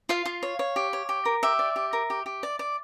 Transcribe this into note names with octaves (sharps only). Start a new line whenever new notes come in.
F4 F5
F4
C#5
C#5
G4
C#5
G4
A#4
G4 E5
D5
G4
A#4
G4
G4
D5
D5